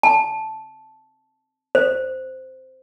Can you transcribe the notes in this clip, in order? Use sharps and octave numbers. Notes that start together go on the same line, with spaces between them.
A5
C5